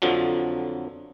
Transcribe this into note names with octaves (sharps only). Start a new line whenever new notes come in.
F2 D3 F3 F#3